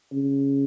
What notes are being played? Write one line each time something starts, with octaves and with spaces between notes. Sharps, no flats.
C#3